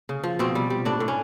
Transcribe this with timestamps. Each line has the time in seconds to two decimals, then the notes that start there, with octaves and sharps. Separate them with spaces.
0.09 C#3
0.23 F3
0.39 B2 C4
0.55 G3
0.70 G3
0.85 A2 D4
1.00 A2
1.08 C#4